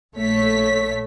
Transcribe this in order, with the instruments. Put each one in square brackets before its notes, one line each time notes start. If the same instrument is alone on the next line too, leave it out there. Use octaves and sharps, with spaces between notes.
[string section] A#1 A3 C#5 B6